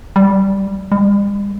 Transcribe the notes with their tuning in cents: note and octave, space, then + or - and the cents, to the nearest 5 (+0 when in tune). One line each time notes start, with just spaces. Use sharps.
G3 -5
G3 +45